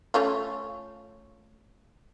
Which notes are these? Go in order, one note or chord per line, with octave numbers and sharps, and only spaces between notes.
A3 C#4 F4